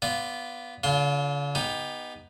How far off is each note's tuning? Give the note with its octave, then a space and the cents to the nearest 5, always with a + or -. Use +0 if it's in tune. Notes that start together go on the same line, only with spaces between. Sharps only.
B3 +0 F4 -20 D5 +0
D3 -45 F4 +0 C6 +0
B3 +0 D#4 +0 G4 +25